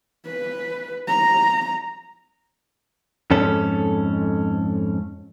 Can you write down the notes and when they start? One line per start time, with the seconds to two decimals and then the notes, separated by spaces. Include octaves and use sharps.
0.26 B4
1.07 A#5
3.31 F2 G#2 C#4 A4